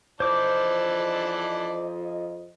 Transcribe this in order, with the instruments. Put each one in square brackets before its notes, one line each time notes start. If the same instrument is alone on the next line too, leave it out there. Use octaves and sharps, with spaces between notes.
[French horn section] F2 F3 D#5 [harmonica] E3 D5 A5 [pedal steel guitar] C5 D6